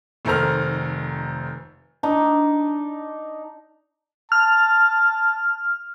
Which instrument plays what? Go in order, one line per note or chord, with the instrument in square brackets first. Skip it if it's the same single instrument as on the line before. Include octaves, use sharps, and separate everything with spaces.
[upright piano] F1 D#3 A4 C5 A#5 F6
[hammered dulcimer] D4 D#4
[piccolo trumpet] A5 [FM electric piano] F6